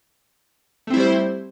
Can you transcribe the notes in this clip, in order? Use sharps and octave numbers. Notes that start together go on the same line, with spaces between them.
G3 A3 C4 E4 C5